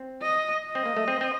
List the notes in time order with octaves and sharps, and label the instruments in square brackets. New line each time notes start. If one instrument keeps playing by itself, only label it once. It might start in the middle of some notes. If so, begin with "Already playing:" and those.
Already playing: [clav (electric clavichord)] C4
[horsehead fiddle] D#5
D#5
[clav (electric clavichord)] C4
A#3
A3
C4
C4